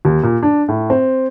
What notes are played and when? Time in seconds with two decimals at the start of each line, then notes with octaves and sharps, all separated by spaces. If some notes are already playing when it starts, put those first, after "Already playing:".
0.05 D#2
0.23 A#2
0.43 D4
0.68 A2
0.90 C4